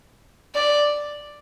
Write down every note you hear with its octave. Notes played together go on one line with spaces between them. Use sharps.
D5